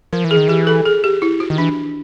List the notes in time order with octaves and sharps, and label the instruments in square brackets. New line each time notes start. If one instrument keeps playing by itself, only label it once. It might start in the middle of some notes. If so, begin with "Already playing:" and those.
[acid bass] F3 [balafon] A#4
[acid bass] E3
[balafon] G#4
[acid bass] D#3
[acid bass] E3 [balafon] G4
[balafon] A4
G#4
G4
E4
F#4
[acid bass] D#3
[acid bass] E3 [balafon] D4